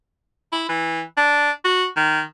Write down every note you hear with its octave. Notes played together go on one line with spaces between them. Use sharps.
E4
E3
D4
F#4
D#3